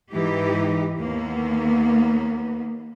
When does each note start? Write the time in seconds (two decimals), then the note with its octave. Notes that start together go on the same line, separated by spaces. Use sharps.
0.11 G#2 E3 D#4 G4
0.98 D#2 A#3 B3